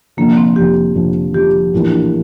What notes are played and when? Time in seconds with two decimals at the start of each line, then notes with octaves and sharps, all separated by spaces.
0.17 F1 F2 D3 F3 A#3
0.37 C4
0.56 F1 F2 D3 F3 G4
0.95 F1 F2 D3 F3
1.33 F1 F2 D3 F3 G4
1.73 A#1 A2 E3 A#3 D4